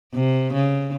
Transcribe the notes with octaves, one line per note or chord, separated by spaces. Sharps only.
C3
C#3